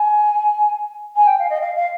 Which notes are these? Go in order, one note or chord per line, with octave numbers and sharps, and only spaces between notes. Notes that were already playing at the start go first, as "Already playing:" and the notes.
Already playing: G#5
G#5
G5
F5
D#5
F5
F5